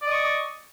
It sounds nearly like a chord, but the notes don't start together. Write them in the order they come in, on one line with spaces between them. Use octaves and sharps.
D5 D#5 C#6